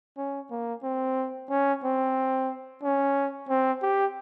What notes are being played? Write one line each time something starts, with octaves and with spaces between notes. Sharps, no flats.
C#4
A#3
C4
C#4
C4
C#4
C4
G4